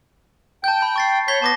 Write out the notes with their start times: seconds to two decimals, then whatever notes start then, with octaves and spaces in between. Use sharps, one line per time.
0.64 G5 A5 G6
0.81 B5 G6
0.96 C#6 A6 C7
1.28 C#5 G6 B6 G7
1.42 B3 A5 D6 A#6